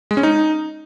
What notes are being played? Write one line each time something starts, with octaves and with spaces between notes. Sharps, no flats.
G#3
C#4
D#4